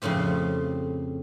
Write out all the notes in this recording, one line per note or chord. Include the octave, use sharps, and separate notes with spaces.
F2 A2 C#3 C4 G4